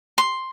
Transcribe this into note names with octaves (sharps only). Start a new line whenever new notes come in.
C6